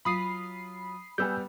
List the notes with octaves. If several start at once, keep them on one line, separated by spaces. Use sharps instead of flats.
F#3 F4 B5 D#6 C7
G3 B3 G#5 E6 G6